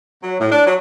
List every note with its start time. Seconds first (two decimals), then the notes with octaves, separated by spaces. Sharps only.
0.23 F#3
0.40 A2
0.52 D4
0.67 F#3